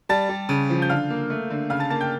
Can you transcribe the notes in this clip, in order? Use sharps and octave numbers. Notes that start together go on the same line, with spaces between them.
G3 A5 A6
G3
C#3
F3
G6
D3 F5 F6
A#3
A3
D3
C#3 F5 F6
A5 A6
A#3 A5 A6
G5 G6